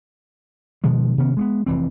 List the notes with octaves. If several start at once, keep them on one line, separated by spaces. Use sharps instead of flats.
B2 D#3 F3 G#3
C3 D#3 B3 C#4
G#3 A#3 B3
F1 E3 C4